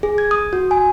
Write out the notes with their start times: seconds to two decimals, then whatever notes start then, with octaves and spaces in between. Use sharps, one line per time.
0.03 G#4
0.18 G#6
0.31 D#6
0.53 F#4
0.71 G#5